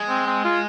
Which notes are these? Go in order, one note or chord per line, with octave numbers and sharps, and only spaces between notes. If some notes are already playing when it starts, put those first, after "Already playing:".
Already playing: G#3
C4
C4
F4